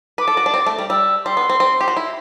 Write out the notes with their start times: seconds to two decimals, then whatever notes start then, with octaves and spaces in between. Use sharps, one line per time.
0.18 B4 D6
0.28 A4
0.37 F#4
0.46 D4
0.54 C4
0.66 A3
0.79 G3
0.90 G3 E6
1.25 G3 C6
1.37 B3
1.50 C4
1.60 C4
1.81 G4
1.88 F#4
1.97 E4